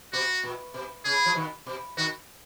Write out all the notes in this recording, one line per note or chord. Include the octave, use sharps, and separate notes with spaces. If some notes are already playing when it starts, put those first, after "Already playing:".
B2 F#4
A#2
B2
C#3 G#4
F3
B2 D#3
B2
B2 D#3 F#4